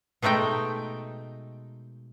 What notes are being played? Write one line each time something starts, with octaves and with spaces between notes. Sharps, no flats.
B2 G#3 A3 D#4 G5